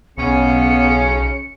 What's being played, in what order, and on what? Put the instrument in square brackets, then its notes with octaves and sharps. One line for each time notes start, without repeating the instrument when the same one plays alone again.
[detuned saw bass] B1 [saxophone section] C#3 C#4 [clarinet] B3 [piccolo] C#7